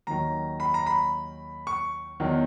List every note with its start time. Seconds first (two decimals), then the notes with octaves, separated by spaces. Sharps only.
0.07 D#2 D#3 F#3 A#5
0.60 B5
0.74 A#5
0.86 B5
1.67 C#6
2.20 E2 D#3 F#3